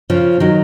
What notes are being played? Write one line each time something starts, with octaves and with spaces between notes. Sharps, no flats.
C#3 F3
D#3 F#3